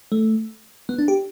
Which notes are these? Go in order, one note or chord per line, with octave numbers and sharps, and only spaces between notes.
A3
B3
D4
G4